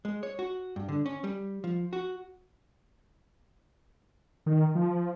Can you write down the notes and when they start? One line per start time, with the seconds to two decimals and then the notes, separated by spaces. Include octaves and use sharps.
0.05 G#3
0.23 C#5
0.39 F#4
0.76 G2
0.89 D3
1.06 C#4
1.24 G3
1.64 F3
1.93 F#4
4.46 D#3
4.75 F3